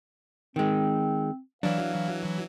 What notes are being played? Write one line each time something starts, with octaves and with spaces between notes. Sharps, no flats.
D#3 G#3 C4
E3 F#3 D4 F5